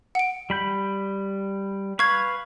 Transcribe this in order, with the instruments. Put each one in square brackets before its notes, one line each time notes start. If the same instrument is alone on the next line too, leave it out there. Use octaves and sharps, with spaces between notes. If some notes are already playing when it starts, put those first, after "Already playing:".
[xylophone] F#5 D7
[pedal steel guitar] G3 B5 G6
[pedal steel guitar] B4 F5 [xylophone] C#6 G#6